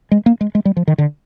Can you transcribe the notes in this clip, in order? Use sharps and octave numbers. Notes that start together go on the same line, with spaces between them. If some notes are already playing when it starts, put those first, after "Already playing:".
G#3
A#3
G#3
G#3
G3
F3
D#3
D3